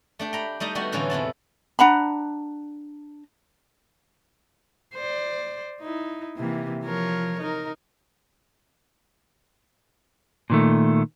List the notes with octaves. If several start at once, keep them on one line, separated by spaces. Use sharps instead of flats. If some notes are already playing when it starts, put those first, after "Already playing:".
A3 D4 G4
G5 A#5 B5
G3 A3 D#4 D#5
G3 A3 B3 F#4
A2 D3 E3 F#3 C#4 F4
E2 C3 E4 A5
D4 F#5 A#5 B5
C5 D5
D#4 E4
C3 E3 A#3
F3 A#4 C#5
D#4 A#4
A#2 D#3 A3